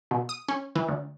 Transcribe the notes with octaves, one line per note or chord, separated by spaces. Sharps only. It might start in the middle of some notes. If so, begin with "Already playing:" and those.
B2
D#6
C#4
E3
D2